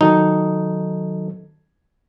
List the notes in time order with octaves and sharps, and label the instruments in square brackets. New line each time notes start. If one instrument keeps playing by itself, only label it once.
[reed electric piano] D#3 F#3 A4 [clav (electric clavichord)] D#4